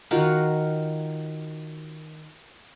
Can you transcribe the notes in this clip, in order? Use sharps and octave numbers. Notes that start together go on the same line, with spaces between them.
D#3 F4 F#4 A#4